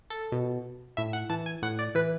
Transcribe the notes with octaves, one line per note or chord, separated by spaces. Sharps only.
A4
B2
A2 E5
F#5
E3 A5
G#5
A2 F#5
D5
E3 B4